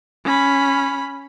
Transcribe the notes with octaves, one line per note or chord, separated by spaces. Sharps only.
C#4 B5